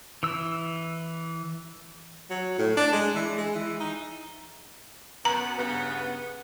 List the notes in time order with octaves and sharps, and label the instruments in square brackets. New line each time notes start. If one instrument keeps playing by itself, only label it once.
[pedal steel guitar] E3 E6
[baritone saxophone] F#3
A2
D4
G#3
E3
G#3
E3
D#4
[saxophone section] F#2 B3 [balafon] A#5
[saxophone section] G2 C#3 B3